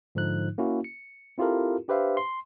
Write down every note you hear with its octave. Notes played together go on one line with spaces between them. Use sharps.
G#2 D3 F3 D#4 F#6
A#3 C#4 E4 F#4
C#7
C4 E4 F4 G4 A4 A#4
D4 G4 B4 C5 E5 F5
C6